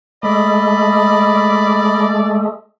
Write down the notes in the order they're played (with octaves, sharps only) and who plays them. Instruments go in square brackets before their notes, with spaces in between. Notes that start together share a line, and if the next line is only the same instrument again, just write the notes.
[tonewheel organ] G#3 A3 [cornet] D5 [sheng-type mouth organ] D#5 B5